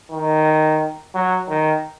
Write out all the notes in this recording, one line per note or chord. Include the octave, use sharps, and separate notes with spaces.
D#3
F#3
D#3